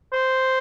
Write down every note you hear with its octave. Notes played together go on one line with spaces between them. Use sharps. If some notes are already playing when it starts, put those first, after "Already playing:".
C5